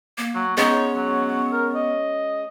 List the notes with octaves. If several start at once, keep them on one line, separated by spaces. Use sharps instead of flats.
A#3
F#3
G#3 B3 C#4 D#4 C#5
F#3
A#4
D#5